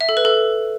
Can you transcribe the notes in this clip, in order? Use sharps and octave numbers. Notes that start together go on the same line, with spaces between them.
E5
A4
B4
A4